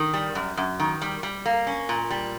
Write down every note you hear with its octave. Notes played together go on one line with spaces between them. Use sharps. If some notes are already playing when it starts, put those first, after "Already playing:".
Already playing: D#3
G3
F#2
F#2
D#3
G3
G3
A#3
C#4
A#2
G3